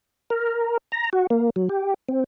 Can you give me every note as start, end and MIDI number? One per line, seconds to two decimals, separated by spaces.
0.30 0.77 70
0.92 1.10 82
1.13 1.27 66
1.30 1.50 58
1.56 1.69 54
1.69 1.94 67
2.08 2.24 60